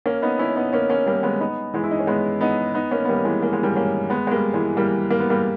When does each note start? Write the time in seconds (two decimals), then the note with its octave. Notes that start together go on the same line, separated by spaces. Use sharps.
0.06 A#3 C#4
0.22 B3 D#4
0.39 C#4 E4
0.56 B3 D#4
0.73 A#3 C#4
0.89 A#3 C#4
1.06 G3 A#3
1.23 G#3 B3
1.40 B3 D#4
1.74 E3 G#3
1.84 E4
1.91 D#4
1.99 C#4
2.07 G#3 B3
2.41 B3 D#4
2.74 B3 D#4
2.91 A#3 C#4
3.05 B3
3.09 G3 A#3
3.25 E3 G#3
3.43 A#3
3.53 G#3
3.63 G3 A#3
3.75 A#3 C#4
4.10 G#3 B3
4.27 G#3
4.31 G3 A#3
4.54 E3 G#3
4.77 G3 A#3
5.11 A#3
5.20 B3
5.30 G3 A#3